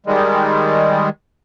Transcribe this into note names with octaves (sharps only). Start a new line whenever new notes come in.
D#3 G3 G#3